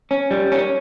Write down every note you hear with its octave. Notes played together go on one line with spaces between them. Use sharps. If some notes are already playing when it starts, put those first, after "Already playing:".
C#4
G3
C#4